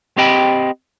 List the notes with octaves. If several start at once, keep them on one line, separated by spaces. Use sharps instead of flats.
C4 G4 D#5 G5 B5